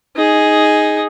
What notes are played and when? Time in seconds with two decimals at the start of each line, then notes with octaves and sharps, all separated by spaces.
0.16 D#4 G#4